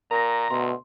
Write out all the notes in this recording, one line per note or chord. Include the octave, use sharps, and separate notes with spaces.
A#2 A#4 A#5 A#6
D2 B2 C6